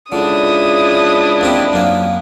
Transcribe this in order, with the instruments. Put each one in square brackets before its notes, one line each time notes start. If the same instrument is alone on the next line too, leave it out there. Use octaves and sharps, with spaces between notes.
[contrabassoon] C#2 [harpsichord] D3 [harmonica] D4 E4 [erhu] D#6
[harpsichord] D#2 C4 G4
F#2 A#3